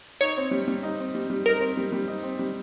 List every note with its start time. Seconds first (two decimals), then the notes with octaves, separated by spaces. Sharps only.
0.21 D#4 C#5
0.37 C4
0.51 G3
0.68 G3
0.83 D#4
0.99 C4
1.15 G3
1.30 G3
1.46 D#4 A#4
1.60 C4
1.77 G3
1.92 G3
2.08 D#4
2.23 C4
2.39 G3